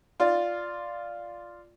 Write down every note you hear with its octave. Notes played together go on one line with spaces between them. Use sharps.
F4 D5